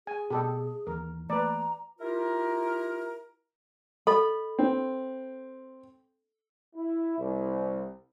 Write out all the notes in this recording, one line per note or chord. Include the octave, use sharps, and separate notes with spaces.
G#4 G#5
B2 G4 A4 D#5
D#2 E3 A#4
E3 A3 A#3 B4 D5 A#5
E4 F4 G4 A#4
A4 D#5 B5
C4
E4
C2